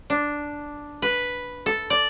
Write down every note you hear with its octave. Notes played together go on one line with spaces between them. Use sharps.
D4
B4
A4
D5